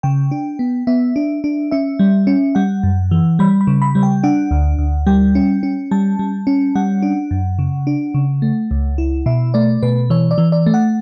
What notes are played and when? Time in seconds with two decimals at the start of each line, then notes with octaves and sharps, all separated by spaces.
0.03 C#3 G5
0.31 D4
0.59 B3
0.87 B3 E5
1.16 D4
1.44 D4
1.71 C#4 E5
1.99 G3
2.27 C#4
2.55 G3 F#5
2.83 F#2
3.11 E3
3.39 G3 B5
3.61 B5
3.67 C#3
3.82 B5
3.95 G3
4.03 G5
4.24 D4 F#5
4.51 D2
4.79 D2
5.07 G3 G5
5.35 C#4
5.63 C#4
5.91 G3 A5
6.19 G3
6.47 C#4
6.75 G3 F#5
7.02 D4
7.31 F#2
7.59 C#3
7.87 D4
8.14 C#3
8.42 A3
8.71 C#2
8.98 E4
9.26 B2 E5
9.54 A3 D5
9.83 B2 B4
10.10 E3 C#5
10.31 D5
10.38 E3
10.52 D5
10.66 A3
10.74 F#5